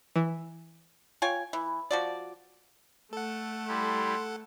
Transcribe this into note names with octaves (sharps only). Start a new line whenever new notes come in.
E3
F4 C#5 G5 G#5
E3
F3 F#4 D5
A3 A4 F#5
G3 E4 G4 C6